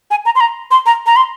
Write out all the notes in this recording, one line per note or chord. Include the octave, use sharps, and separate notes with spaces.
G#5
A#5
C6
A#5
C6
A#5
A#5
C6